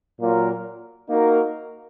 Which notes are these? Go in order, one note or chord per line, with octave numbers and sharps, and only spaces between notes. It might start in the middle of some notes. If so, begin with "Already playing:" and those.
A#2 F#3 A#3 F4 A#4
A#3 D#4 F#4 A#4